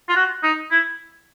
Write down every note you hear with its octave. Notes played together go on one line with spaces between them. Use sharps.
F4
F#4
D#4
E4